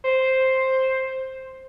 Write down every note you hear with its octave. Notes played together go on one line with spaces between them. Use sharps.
C5